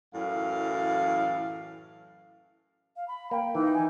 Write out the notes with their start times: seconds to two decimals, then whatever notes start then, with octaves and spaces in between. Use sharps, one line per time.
0.15 F#2 A2 E3 F5
2.96 F5
3.08 B5
3.31 A#3 G5
3.55 E3 D#4
3.73 G#5